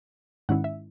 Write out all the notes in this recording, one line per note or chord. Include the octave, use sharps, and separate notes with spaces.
G#2 D#3 G#3 C#4 E4 F#5
E5